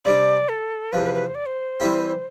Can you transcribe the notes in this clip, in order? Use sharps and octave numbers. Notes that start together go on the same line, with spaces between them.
C3 G3 D4 D5
A4
E2 C3 F3 B4
B4
B4
C5
D5
C5
E3 G3 C4 E4 G4